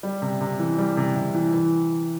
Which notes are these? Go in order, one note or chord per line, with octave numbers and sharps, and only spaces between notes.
G3
C3
C3
E3
G3
C3
C3
E3
E3